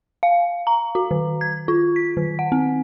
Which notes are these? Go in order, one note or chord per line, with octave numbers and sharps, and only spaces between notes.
F5
A#5
F#4
D#3
G#6
F4
B6
D#3
F#5
C4